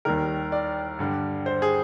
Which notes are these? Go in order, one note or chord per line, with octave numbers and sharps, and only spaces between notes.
D#2 D#3 G3 A#4
D5
G2 D3 G3
C5
G#4